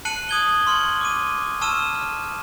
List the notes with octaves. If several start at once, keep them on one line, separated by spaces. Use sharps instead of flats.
A5 F#6 C7 C#7 D#7 F#7
D#6 G#6 G7
C6 C#6 F6
D6 D#7
A5 C#6 E6 F6 D#7 E7